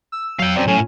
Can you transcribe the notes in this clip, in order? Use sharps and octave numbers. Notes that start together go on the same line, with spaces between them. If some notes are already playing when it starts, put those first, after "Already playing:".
E6
F#3 F5 G5
F#2 C4 D5
A2 C#4 G#5